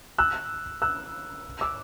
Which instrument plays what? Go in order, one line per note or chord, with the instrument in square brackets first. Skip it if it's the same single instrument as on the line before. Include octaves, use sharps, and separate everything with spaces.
[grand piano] E6 F#6
E6 F#6
D6 E6